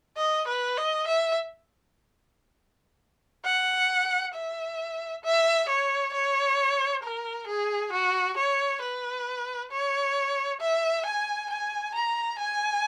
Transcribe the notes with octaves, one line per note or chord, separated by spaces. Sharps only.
D#5
B4
D#5
E5
F#5
E5
E5
C#5
C#5
A#4
G#4
F#4
C#5
B4
C#5
E5
G#5
G#5
A#5
G#5